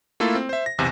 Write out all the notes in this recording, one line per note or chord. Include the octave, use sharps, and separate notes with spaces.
A3 A#3 E4 F4 A4
C4
C5 E5
A#6
B1 E2 C3